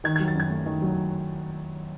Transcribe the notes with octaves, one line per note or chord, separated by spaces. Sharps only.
D#3 G#6
G#6
F#3
A6
F#2 G#6
A3
D#3
F#3